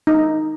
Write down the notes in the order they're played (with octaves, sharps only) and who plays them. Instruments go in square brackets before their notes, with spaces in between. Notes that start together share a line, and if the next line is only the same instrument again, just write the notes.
[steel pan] D#4